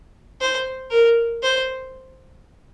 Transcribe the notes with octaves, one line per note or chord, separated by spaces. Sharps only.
C5
A#4
C5